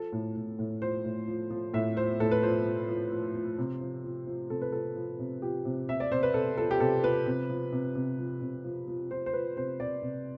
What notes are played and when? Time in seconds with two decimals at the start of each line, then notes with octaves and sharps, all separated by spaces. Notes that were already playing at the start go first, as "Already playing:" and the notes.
Already playing: F3 A4
0.13 A2
0.36 A2
0.59 A2
0.82 F3 C5
1.05 A2
1.28 F3
1.50 F3
1.74 A2 E5
1.97 F3 C5
2.20 A2 A4
2.31 B4
2.43 F3 C5
2.66 F3
2.89 F3
3.12 F3
3.35 F3
3.58 C3
3.81 F3
4.04 F3
4.27 F3
4.50 C3 A4
4.62 B4
4.73 F3 A4
4.96 F3
5.19 C3
5.42 F3 G4
5.65 C3
5.88 C3 E5
6.00 D5
6.12 C3 C5
6.23 B4
6.34 C3 A4
6.58 F3 A4
6.71 G4
6.80 C3 A4
7.03 F3 B4
7.26 C3
7.50 F3
7.72 C3
7.95 C3
8.18 F3
8.41 C3
8.64 F3
8.88 F3
9.11 F3 C5
9.26 C5
9.33 F3 B4
9.57 C3 C5
9.80 C3 D5
10.03 C3